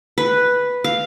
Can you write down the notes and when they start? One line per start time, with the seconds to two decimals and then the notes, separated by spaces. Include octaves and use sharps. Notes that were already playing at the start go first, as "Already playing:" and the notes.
0.18 B4
0.84 F5